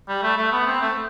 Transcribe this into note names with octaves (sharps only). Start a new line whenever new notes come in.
G3
A3
A3
B3
C4
A3